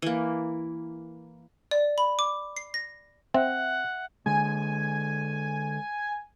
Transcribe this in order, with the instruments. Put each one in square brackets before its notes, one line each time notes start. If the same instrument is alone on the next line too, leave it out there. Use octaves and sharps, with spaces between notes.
[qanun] E3 A#3
[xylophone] D5
B5
D6
C7
A#6
[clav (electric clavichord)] C4 [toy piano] E5 [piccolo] F#5
[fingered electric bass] D3 G#3 [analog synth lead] G#5